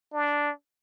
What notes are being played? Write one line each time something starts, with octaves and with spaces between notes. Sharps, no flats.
D4